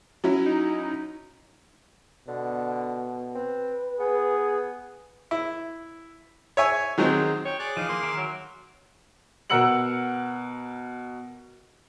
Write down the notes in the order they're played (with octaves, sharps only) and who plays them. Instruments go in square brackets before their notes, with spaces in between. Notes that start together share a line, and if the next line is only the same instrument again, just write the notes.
[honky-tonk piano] F#3 C#4 E4
[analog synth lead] D#4
[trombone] B2 [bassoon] D3
[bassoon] C4 [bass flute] B4
[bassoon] B3 [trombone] G#4
[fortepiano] E4
C#5 E5 G#5
D#3 F#3 G#3 C4
[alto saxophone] C#5 [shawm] G5
[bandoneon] G#4 D6 F#6 [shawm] D5
[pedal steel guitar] E3 F3 [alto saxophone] D#4 [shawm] F5
[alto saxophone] A#3 [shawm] C6
[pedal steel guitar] D#3 A#4 E5
[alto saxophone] F#3
[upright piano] B2 A#4 F#5 E6 C#7 F#7